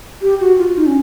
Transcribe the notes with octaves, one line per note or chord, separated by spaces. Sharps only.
G4
F#4
F4
D#4
C#4